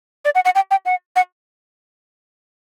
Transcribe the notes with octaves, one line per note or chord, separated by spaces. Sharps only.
D5
F#5
F#5
G5
G5
F#5
F#5